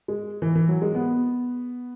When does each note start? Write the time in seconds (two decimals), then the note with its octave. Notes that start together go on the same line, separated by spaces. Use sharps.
0.08 G#3
0.42 E3
0.55 E3
0.68 F#3
0.82 G#3
0.95 B3